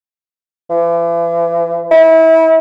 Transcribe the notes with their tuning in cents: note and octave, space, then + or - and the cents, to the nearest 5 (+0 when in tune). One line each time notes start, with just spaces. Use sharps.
E3 +40
E4 -30